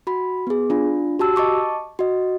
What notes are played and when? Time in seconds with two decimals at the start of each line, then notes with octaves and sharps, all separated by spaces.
0.07 F#4 B5
0.47 B3 G#4
0.70 D4 F4
1.19 F#4 G4 A5 E6
1.36 D#5 A5 C#6 D6
1.99 F#4 D#5